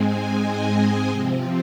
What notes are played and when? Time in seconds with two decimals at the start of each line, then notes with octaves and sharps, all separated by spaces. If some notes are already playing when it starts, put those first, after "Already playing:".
Already playing: G#2 G#3 C4 G#5
0.32 D#5
1.10 C3 F3 C4